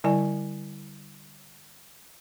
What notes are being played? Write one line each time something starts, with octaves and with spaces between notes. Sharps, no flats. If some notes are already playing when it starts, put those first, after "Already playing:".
D3 G3 E4 D5 G#5